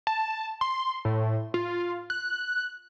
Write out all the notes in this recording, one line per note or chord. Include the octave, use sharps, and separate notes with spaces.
A5
C6
A2
F4
F#6